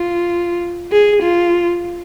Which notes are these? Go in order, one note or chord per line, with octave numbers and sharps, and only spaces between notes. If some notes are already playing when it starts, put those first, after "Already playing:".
Already playing: F4
G#4
F4